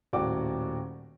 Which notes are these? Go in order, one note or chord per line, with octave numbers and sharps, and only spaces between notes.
D#1 A2 F#4 D5 G5 D6